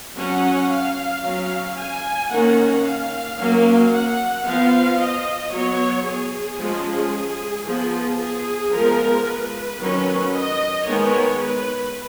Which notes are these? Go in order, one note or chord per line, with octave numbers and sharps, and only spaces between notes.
F#3 C#4 F#5
F5
F#3 C#4
G#5
D#3 A#3 C#4 F#5
F5
F#3 A#3 C#4
F#5
F3 B3 F5
D#5
F#3 B3 C#5
G#4
F3 G#3 C#4
F3 B3
G#4
F3 G#3 B3 A#4
B4
D#3 F#3 C#4
D#5
D#3 G#3 B3 C#5
B4